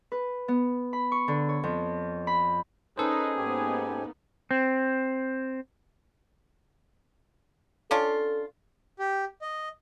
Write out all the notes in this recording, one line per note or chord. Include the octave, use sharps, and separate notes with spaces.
B4
B3
B5
C#6
D3
C#5
F2
B5
C#4 D#4 G#4 A4 B4 C5
G#2 A#3 B3 D#4 G4 G#5
C4
C#4 D4 F4 A4
G4
D#5